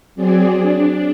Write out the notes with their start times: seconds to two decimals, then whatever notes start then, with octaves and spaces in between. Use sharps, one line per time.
0.15 F#3 C4 G#4 D5
0.60 D4